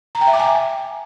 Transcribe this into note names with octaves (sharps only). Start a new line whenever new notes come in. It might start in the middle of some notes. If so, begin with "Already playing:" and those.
A#5
G5
E5
D6
G#5